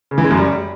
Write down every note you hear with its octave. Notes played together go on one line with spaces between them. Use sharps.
C#3
E3
G#3
F#2
G3